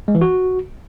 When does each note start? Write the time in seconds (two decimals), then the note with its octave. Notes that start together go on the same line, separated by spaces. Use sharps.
0.08 G#3
0.15 E3
0.21 F#4